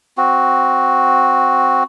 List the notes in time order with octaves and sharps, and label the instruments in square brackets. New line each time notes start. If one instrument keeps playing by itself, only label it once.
[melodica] C4 F#4